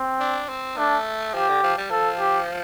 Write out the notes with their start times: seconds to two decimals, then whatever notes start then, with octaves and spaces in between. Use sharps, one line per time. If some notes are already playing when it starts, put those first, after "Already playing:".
Already playing: C4
0.20 D4
0.49 C4
0.77 A3 D4
1.34 F3 G4
1.49 D3
1.63 F3
1.77 G3
1.91 F3 A4
2.19 G4